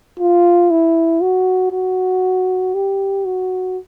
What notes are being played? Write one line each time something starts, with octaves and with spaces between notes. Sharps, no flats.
F4
E4
F#4
F#4
G4
F#4